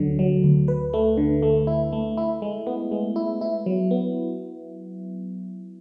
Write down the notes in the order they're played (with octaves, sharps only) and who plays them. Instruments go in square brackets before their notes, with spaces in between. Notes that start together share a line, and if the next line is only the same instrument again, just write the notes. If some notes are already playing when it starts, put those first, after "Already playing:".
Already playing: [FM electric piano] D2 D3 F#3
F#3
D2
B4
A3
D3
A3
E4
A3
E4
G#3
B3
G#3
E4
E4
F#3
B3